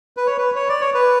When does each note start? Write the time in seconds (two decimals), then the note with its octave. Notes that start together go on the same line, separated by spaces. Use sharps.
0.17 B4
0.27 C#5
0.38 B4
0.56 C#5
0.69 D5
0.81 C#5
0.94 B4